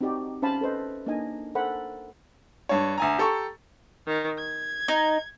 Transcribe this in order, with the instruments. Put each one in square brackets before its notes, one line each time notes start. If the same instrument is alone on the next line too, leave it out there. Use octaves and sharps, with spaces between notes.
[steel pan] C4 D#4 F#4 G4 D5
C#4 C5 F5 A5 B5
A4 B4 C5 D#5
A#3 D4 D#4 D#5 G#5
A4 A#4 C5 F#5 G#5 B5
[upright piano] G2 C#5
D2 G#5 A#5
G4 A4 A#5 C#6
[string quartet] D#3
G#6
[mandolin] D#4